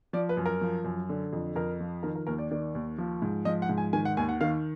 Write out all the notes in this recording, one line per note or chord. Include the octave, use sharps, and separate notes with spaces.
F3 D5
B4
F#2
A#4
F3
F#2
D3
F2
F2 A#4
F3
D#3 A#4
A#4
D#2 A#4
D5
D#3 D5
D#2
F3
G#2
F3 D#5
F#5
G#2
G#5
D#3 G#5
F#5
D#2 G#5
F#5
D#3 F5